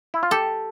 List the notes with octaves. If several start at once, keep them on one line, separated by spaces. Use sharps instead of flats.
E4
F4
G4 A4